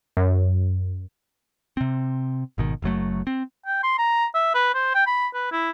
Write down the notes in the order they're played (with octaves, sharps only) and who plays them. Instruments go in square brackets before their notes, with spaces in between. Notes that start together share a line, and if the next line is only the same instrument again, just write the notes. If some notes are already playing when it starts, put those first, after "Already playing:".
[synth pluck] F#2
[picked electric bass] C3 C4
G#1 B2 D#3
F#1 F#2 F#3 A3
C4
[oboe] G5
C6
A#5
E5
B4
C5
G5
B5
B4
E4